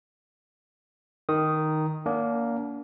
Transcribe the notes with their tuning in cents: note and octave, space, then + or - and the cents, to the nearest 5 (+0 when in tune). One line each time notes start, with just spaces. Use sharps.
D#3 +0 A#4 +0 D#6 +0
A#3 +0 D4 -40 F#5 +0